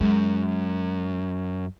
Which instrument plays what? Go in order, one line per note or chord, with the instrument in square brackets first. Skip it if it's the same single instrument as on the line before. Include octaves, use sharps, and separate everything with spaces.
[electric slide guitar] F#2 [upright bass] G#3